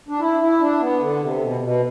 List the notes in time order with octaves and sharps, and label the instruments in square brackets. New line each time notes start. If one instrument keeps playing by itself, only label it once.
[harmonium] D4
E4
E4
D4
B3
D3
C3
B2
B2